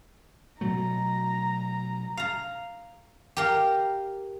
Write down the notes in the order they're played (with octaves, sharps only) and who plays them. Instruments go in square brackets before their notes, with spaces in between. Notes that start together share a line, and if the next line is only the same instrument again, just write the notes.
[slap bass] B2 F#3 A3 [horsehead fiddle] A#5
[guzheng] F5 A#5
G4 A#4 F5